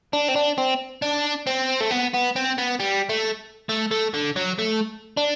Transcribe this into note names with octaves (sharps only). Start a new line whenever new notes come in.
D4
C4
D4
C4
D4
C4
A3
B3
B3
C4
B3
G3
A3
A3
A3
D3
F#3
A3
D4